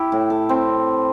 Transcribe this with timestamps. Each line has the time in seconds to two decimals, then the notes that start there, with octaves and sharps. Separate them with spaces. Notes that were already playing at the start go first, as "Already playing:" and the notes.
Already playing: E4 G4
0.12 A2
0.30 A4
0.49 C4